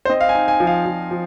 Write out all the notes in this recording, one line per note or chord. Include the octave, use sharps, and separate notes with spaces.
C5
C4 D#5
F5
G#5
D#4
G#5
F3
F5
F3
F3